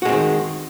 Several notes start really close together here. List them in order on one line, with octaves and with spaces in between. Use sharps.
F#4 G#3 C4 D#3